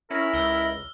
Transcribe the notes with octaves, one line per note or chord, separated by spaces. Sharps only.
C#4 E4 A#4
C#2 E6 F6 G7